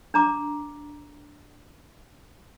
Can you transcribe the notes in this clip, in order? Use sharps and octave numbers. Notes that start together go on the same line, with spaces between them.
D4 A#5 D6